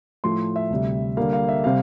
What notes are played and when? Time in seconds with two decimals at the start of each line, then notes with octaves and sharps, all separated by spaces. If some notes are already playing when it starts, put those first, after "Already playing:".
0.24 A2 F3 A3 C6
0.56 E5
0.70 D2 C3 G3
1.17 D3 G3 A#3 F5
1.33 F5
1.49 E5
1.64 C3 G3 C4 F5